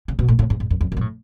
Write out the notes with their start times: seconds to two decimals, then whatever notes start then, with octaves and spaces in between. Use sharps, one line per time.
0.08 C#3
0.19 B2
0.28 A2
0.39 A2
0.50 G#2
0.60 G#2
0.70 F#2
0.81 F2
0.92 F#2
0.97 B2
1.01 A2